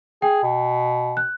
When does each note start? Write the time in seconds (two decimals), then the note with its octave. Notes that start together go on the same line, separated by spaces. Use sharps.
0.22 G#4 G5
0.43 B2
1.17 F#6